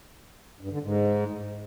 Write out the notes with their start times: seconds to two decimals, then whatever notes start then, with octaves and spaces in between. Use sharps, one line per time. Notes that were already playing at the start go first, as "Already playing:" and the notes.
0.61 G2
0.72 D3
0.82 G#2